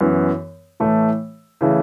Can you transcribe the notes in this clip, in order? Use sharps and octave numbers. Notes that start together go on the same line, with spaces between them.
F#2 E3 B3
A2 E3 A3 E4 A4
C#3 E3 A3